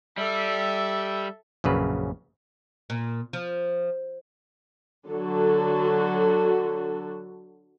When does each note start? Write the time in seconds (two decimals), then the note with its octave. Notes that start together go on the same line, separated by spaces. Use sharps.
0.18 G3 A4 E5
1.64 A#1 F#2 C#3 B4
2.90 A#2
3.33 F3
5.08 D3 F#3 F#4 A4